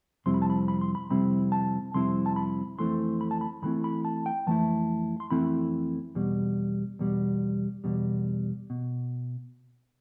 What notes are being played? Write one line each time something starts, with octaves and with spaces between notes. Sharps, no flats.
F2 C3 G3 C4 E4 C6
B5
A5
B5
B5
C6
B5
F2 C3 G3 C4 E4 B5
A5
F2 C3 G3 C4 E4 C6
A5
B5
F2 E3 A3 C4 E4 C6
B5
A5
B5
F2 E3 A3 C4 E4 B5
B5
A5
G5
F2 E3 A3 E4 A5
C6
F2 E3 A3 C4 E4 B5
E2 B2 G3
E2 B2 G3
E2 B2 G3
B2